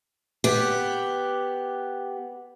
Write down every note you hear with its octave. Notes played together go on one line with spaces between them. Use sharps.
B3 G4